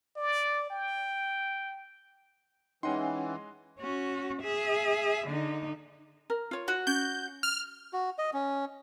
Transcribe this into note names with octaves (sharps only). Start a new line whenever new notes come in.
D5
G5
E3 G#3 C#4 D#4 D#5 F#5 G5 C6
C#4 F#4
G#4 E5
D3 D#4
A#4
F4 C#5
F#4
C#4 G6
F6
F#4
D#5
C#4